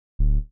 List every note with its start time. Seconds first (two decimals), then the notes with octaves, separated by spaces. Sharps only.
0.19 D1